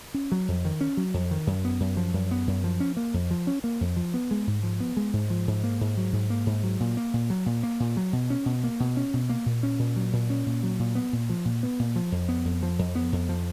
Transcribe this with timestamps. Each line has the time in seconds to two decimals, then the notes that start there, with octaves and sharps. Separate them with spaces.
0.14 C#4
0.32 F#3
0.48 F2
0.65 D#3
0.81 C#4
0.97 F#3
1.14 F2
1.31 D#3
1.47 F#2
1.65 B3
1.80 F#2
1.97 F3
2.14 F#2
2.31 B3
2.47 F#2
2.64 F3
2.80 C#4
2.97 A#3
3.14 F2
3.31 F3
3.47 C#4
3.64 A#3
3.81 F2
3.96 F3
4.14 B3
4.31 G#3
4.47 G#2
4.63 F3
4.80 B3
4.97 G#3
5.13 G#2
5.30 F3
5.47 G#2
5.63 A#3
5.81 G#2
5.97 F#3
6.13 G#2
6.30 A#3
6.46 G#2
6.63 F#3
6.80 A#2
6.97 A#3
7.14 A#2
7.30 F#3
7.46 A#2
7.63 A#3
7.80 A#2
7.97 F#3
8.13 B2
8.30 C#4
8.46 B2
8.64 A#3
8.80 B2
8.97 C#4
9.13 B2
9.29 A#3
9.46 A#2
9.63 C#4
9.79 A#2
9.96 F#3
10.13 A#2
10.30 C#4
10.46 A#2
10.63 F#3
10.79 A#2
10.95 B3
11.13 A#2
11.29 F3
11.45 A#2
11.63 B3
11.79 A#2
11.96 F3
12.12 F2
12.29 B3
12.45 F2
12.63 F3
12.79 F2
12.95 B3
13.12 F2
13.29 F3